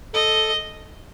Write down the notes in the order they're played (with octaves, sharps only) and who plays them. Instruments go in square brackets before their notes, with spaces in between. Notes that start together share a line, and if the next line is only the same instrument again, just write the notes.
[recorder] A4 [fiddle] D#5